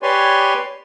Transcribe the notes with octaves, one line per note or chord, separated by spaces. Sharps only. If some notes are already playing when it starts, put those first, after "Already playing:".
G4 B4 C#5 D5 G#5 C6